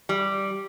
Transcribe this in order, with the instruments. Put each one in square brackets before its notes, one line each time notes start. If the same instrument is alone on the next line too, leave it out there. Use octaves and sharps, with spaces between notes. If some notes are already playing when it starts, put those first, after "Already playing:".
[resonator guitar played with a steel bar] G3